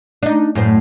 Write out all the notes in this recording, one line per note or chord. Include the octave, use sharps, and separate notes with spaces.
D4 D#4
F#2 A2 C5